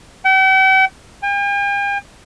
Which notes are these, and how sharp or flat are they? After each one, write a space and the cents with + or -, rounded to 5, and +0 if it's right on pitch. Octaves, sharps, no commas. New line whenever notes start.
G5 -45
G5 +45